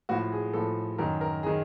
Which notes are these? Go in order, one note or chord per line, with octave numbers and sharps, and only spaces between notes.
A2 F3 F#4
G#4
A2 F3 A4
F#2 D#3 A#4
A#4
G#4
D#3